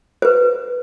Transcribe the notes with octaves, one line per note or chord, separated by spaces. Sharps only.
B4 C5